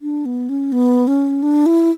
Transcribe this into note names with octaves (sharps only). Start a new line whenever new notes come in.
D4
B3
C#4
B3
C#4
D4
E4